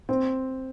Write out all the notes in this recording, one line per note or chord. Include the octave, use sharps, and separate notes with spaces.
C4